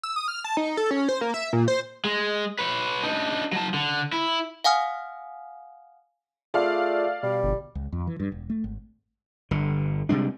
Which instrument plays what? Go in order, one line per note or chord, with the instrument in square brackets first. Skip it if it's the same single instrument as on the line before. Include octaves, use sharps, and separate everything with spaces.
[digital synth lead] E6
D#6
F6
A5
D#4
A4
C#4
C5
A#3
E5
A#2
C5
[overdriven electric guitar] G#3
B4 C#5
D4 D#4
F#3 A5
D3
E4
[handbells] F5 F#5 G#5 D#6 F6
[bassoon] A3 [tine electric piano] F4 G#4 [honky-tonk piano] D5 F5
[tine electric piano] B2 [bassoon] G3
[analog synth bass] G1
[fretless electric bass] C#2
F2
E3
G2
E1
A3
G#1
[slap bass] G1 D3
C3 G3 G#3 D4